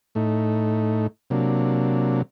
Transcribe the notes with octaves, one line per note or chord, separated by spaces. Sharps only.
A2 A3 D#4
C3 F#3 A#3 D4